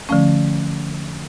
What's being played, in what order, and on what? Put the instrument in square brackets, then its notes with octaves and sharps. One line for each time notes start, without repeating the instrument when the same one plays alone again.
[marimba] D3 F3 A3 C#4